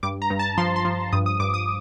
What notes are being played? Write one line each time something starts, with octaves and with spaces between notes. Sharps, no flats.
G2 D6
A#5
G2
A5
F3 C6
C6
F3
G2 D#6
D#6
G2 D6
D#6